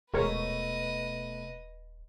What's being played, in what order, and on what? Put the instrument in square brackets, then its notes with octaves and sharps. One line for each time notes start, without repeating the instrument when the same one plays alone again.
[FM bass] D#1 [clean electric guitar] B2 A3 [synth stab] G#3 A#4 C#5 [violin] B4 D#5